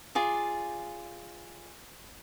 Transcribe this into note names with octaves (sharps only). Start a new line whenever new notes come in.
F4 G#4 D5